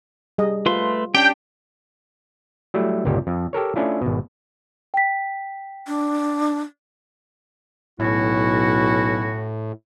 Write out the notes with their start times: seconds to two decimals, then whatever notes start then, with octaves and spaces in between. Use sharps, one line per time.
0.38 G3 G#4 D#5
0.66 A3 F4 B4 C6
1.15 C#4 D4 G4 G5
2.74 F#3 G3 A3 E4
3.05 G1 C#2 A#2 G3 G4
3.27 F2
3.53 G4 A4 A#4 C#5
3.76 A3 C#4 D4 E4 F4
4.02 G#1 B2
4.94 G5 B6
5.87 D4
8.00 B1 A2 C#4 E4 F#4